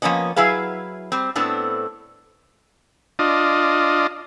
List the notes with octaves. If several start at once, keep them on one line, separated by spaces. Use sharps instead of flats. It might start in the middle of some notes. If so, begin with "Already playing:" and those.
F3 A#3 B3 C#4 D#5
F#3 E4 G#4 B4 F5
G3 C4
A2 B3 C4 D4 A4
D4 F4 D#5